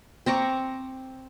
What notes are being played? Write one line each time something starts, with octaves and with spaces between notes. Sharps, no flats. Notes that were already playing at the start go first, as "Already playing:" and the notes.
C4 A#5 C#6 D6